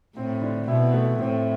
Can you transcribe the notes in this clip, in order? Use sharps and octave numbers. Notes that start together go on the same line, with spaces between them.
A2 C4
D3
B2 E4
A3
A2 C4